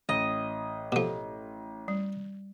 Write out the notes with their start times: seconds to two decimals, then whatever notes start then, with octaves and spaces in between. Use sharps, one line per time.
0.09 A1 D#5
0.92 B2 F3 G4 A4
1.88 G3